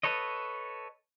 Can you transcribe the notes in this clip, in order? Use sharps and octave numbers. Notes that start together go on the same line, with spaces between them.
A4 B4 C#5 D#5